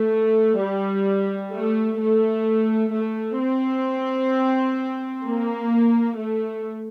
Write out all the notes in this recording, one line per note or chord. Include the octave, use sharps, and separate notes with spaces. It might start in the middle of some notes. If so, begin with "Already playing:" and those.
Already playing: A3
G3
A3
A3
A3
C4
A#3
A3